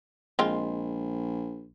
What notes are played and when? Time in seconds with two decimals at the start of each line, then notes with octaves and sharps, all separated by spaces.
0.39 A#1 G#3 C4 F4